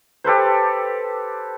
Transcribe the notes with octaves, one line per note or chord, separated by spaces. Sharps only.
G4 A4 B4 C5